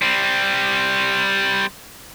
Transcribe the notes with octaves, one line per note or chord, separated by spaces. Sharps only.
G3 C4